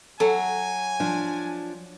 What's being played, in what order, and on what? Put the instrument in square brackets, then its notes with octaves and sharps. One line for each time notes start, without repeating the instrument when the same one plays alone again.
[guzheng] F#3 [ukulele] A4 [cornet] G#5
[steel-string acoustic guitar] F3 D4